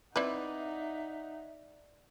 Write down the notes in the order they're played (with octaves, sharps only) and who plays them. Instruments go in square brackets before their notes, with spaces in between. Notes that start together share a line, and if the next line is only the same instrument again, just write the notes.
[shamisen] C4 E4 B4 [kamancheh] D#4 F#5 [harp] D5 [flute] E5